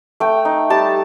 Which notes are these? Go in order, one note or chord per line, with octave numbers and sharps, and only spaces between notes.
A3 G5
D#4
G3 A5